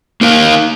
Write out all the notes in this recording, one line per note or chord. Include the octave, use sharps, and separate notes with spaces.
A#3 D#4 A#4 F5